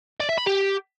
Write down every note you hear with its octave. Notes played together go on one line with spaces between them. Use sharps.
D5
E5
B5
G4